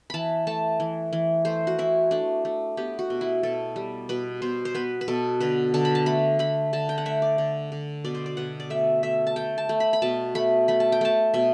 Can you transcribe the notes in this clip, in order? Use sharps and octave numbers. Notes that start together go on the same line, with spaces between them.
E3 A5 B5
A3 A5
E3
E3
A3 C5
F#4
E3 E4
A3 D4
A3
B3 G4
F#4
B2
E4
B2 A4
G3
B2 B4
B2 C5
C5
B3 B4
B4
B2 A4
D3 B4
D3 A5
B5
A5
A3 B5
A3 B5
D3 A5
G5
F#5
A3 E5
D5
D3
D3
B2 D5
C5
D5
B2 F#5
D5
A3 E5
A3 E5
A5
A3 G5
A5
A3
B5
B5
B2 A5
A3 B5
A3 B5
A5
G5
A3 A5
B2 E5